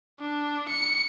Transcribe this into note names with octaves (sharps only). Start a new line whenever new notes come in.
D4
C#7